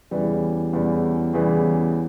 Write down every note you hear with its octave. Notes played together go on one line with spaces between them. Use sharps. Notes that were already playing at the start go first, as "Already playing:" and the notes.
E2 C#3 E3 G3
E2 C#3 E3 G3
E2 C#3 E3 G3